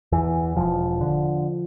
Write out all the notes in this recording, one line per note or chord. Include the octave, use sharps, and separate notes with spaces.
E2 E3
E1 F3
D3